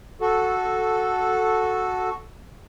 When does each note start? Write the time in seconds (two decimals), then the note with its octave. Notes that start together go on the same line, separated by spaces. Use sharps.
0.21 F#4 A4